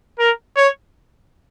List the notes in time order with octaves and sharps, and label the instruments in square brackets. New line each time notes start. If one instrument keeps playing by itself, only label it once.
[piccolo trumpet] A#4
C#5